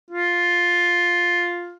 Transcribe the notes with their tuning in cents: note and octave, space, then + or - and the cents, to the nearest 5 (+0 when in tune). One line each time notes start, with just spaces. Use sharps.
F4 +5